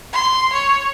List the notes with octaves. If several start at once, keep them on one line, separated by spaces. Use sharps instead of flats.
C6
C#5